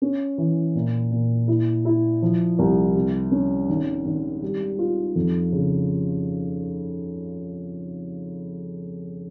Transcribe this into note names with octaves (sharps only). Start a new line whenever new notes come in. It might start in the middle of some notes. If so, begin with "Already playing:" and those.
C#4
E3
A#2
A#2
E4
E4
F3
C2
C3
C#4
G#1
G#1
G3
F4
F2
C#3